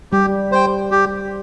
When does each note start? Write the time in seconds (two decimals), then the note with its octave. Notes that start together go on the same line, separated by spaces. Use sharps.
0.12 G3 G4
0.52 C5 G5
0.91 G4